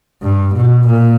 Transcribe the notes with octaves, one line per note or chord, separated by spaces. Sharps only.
G2
B2
A#2